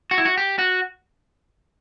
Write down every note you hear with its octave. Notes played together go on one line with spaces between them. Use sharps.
F#4
E4
F#4
G4
F#4